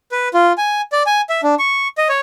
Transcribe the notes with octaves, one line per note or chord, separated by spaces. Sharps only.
B4
F4
G#5
D5
G#5
E5
D4
C#6
D#5
C#5